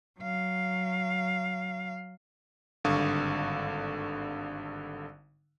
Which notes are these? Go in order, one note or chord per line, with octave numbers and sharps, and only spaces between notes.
F#3 F5
G#1 G2 D3 F5 C#6 D#6